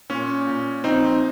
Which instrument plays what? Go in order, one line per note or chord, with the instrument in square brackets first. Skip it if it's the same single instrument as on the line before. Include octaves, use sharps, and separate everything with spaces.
[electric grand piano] A#2 C#4
A#2
A#1 C4 D#4